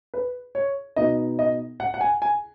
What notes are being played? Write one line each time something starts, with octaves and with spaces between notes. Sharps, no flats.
B4
C#5
B2 B3 D#4 D#5
D#5
F#5
F#5
G#5
G#5